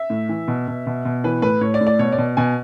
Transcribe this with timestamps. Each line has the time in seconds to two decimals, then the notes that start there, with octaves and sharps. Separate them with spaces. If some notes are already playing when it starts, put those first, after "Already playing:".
Already playing: E5
0.10 A2
0.29 E3
0.48 B2
0.68 B2
0.87 B2
1.05 B2
1.24 E3 B4
1.42 A2 B4
1.61 A2 C#5
1.74 D5
1.81 A2
1.87 D5
1.99 B2 C#5
2.12 D5
2.18 B2
2.37 B2 G#5